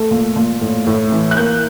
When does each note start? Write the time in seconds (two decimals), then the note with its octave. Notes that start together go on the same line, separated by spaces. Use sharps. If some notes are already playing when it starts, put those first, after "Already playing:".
Already playing: A3
0.11 A#2
0.36 A#2
0.61 A2
0.87 A2
1.12 E3
1.31 F#6
1.37 A#3 G6